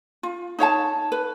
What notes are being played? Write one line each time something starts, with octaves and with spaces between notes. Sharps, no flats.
F4
D#4 C#5 F5 A5
B4